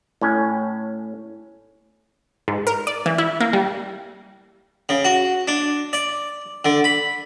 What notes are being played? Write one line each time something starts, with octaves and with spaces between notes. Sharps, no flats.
A2 C#4
G#2
A#4
D5
E3
E4
A#3
G3
C#3
F#4
D4
D5
D3
B5